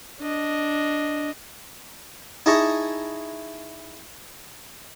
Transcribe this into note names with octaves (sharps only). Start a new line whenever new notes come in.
D4 D#5
D#4 E4 G#4 D#5 A5 C#6